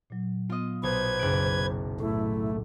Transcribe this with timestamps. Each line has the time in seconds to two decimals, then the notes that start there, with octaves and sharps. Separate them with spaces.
0.10 A#2 F#3
0.50 B3 F4 D#5
0.83 B1 B4 C5 G#6
1.19 F#1 F#6 D7
2.00 A2 A3 E4